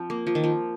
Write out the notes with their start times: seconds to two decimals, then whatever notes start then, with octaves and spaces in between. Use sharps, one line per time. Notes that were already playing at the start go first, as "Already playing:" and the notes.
Already playing: F3 C4
0.10 A#3
0.27 F3
0.35 D#3
0.44 F3